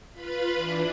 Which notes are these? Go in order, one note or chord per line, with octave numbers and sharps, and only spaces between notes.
F4 B4 B5
E3 D4